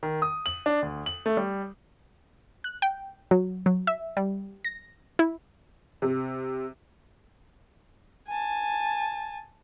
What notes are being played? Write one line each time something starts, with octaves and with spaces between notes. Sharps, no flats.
D#3
D#6
F#7
D4
D2
F#7
A3
G3
F#6
G5
F#3
F#3
E5
G3
A#6
E4
C3
G#5 A5